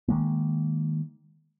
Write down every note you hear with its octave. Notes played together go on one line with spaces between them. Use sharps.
D#3 G#3 A#3